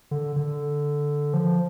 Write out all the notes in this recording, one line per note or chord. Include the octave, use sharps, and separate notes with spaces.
D3
D3
F3